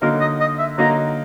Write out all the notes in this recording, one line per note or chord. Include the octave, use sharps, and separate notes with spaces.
D3 F#3 A#3 D#4 A#4
D#5
D#5
E5
D3 F#3 A#3 D#4 A#5